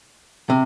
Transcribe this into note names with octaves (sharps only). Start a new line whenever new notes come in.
C3